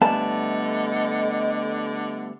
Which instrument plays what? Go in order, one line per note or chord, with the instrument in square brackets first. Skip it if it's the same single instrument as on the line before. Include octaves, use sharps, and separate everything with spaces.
[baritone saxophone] D3 [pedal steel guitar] G3 A3 B3 [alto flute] D#5 [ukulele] A5